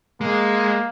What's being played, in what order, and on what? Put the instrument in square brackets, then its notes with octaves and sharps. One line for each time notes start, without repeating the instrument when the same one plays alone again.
[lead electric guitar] G#3 [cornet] A#3